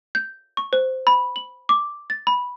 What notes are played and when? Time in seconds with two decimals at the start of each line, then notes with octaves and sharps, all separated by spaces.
0.15 G6
0.57 C#6
0.73 C5
1.07 B5
1.36 F#7
1.69 D6
2.10 A6
2.27 B5